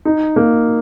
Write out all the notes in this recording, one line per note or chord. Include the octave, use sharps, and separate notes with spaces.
D#4
A#3